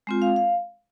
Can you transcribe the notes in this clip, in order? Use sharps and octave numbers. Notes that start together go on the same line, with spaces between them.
G#3 C4 F4
F5
F5